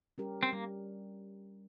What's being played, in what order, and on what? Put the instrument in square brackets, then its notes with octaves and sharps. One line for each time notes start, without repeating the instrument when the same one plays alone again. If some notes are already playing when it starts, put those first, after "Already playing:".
[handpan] G3 C#4 G4 A#4
[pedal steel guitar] C4
[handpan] G3 [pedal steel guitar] A#3